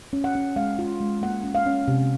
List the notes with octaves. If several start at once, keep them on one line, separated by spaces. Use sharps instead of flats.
C#4
F#5
C#4
G#3 F5
F4
G#3
A#3 F#5
C#4
F5
C#4
C3